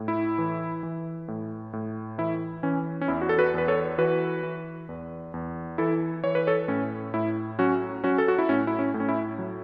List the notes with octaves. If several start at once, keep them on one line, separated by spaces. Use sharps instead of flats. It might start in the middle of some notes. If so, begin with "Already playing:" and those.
Already playing: A2
E4
E3
E3
A2
A2
E3 E4
E3 C#4
C#4
E2 E4
F#4
A4
F#4 B4
E2 B4
A4 C#5
E3 F#4 B4
E3
E2
E2
E3 E4 A4
E3 C#5
B4
A4 C#5
A2 C#4
A2 E4
F#3 C#4 F#4
F#3 C#4 F#4
A4
F#4
E4
A2 C#4
E4
C#4
A2
C#4
E4
F#3